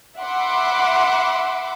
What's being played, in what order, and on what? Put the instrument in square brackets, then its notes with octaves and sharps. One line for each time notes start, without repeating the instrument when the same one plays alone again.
[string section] E5 F#5 B5 C6 D6